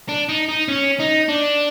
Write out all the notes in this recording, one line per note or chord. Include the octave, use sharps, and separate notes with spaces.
D4
D#4
D#4
C#4
D#4
D4